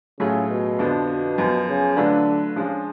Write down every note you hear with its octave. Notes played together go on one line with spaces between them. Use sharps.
A2 C#3 F#3 A3 F4 G#4
B2
F2 D3 F3 B3 D4
B2
F#2 F3 B3
C#3
D3 F#3 A3 D4 F4 B4
C#3 F3 G#3 D4 F4